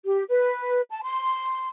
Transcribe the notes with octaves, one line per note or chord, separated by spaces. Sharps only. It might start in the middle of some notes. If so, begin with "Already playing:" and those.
G4
B4
A5
C6